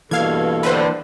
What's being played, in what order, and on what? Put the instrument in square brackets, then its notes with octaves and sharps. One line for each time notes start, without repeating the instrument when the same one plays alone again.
[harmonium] G2 B2 A4 [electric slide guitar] E3 A#3 [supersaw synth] F5 G#6
[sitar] A2 D3 [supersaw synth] B4 C5